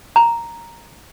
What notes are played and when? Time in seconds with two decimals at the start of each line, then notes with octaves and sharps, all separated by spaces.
0.16 A#5